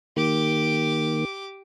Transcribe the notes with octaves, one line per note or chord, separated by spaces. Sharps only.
D#3 A#3 G4 D6